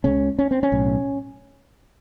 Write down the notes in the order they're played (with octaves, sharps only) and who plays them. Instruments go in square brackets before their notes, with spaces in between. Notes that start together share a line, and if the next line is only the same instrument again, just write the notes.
[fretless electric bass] C#2 C#3 C#4
C#4
C4
C#4
B1 A2